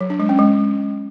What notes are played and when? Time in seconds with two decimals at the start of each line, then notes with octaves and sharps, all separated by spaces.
0.01 F#3
0.10 D4
0.20 G#3
0.29 C#4
0.39 G#3